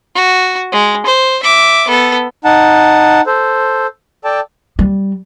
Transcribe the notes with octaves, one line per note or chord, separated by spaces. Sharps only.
F#4
G#3
C5
E5 D6
B3 A4
D#4 F#5 A5
A4 C5
A4 D5 G5 A5
G3